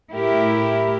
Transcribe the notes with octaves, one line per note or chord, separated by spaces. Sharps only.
A2 E4 G4 A#4